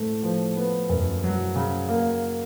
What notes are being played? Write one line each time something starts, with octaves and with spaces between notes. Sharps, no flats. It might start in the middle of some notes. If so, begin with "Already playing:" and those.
Already playing: A2 A3 C4
F3
B3
F#2
F#3
C#3
A#3